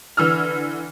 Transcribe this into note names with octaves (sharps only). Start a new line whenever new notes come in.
D3 E3 E6 F6